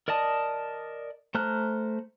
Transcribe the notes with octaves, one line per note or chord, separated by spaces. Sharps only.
A#4 D5 D#5 A5 D#6
A3 C5 A#5 F6 F#6